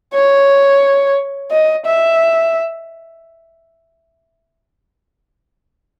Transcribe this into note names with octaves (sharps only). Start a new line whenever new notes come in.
C#5
D#5
E5